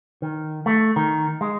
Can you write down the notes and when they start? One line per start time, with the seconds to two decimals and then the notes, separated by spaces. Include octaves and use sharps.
0.22 D#3
0.66 A3
0.96 D#3
1.41 G#3